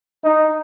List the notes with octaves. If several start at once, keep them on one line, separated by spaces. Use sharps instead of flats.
D#4